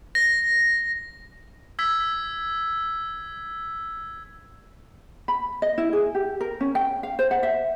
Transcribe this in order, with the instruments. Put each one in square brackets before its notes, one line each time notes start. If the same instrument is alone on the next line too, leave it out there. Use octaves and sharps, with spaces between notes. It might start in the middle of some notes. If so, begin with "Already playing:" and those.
[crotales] A#6
E6 G#6 B6
[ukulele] B5
D#5
E4
G#4
G4
A#4
C#4
G5
F5
C5
F#5
E5